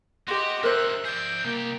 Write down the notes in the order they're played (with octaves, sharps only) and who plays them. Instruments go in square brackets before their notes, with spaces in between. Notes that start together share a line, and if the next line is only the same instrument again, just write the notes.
[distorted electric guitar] F#4 [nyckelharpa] G4 D#5 [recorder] C6
[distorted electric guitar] D3 F#3 [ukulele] A#4 C5 [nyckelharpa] E5 [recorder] F#6
[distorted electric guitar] G#4 D5 [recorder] G6
[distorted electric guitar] C2 G4 [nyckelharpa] A#3